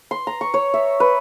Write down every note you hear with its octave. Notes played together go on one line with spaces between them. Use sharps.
C6
A#5
C#6
C#5
E5
B4